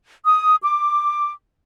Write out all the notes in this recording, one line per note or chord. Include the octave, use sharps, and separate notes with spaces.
D#6
D6